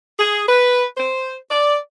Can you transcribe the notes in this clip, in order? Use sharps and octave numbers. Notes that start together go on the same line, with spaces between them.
G#4
B4
C5
D5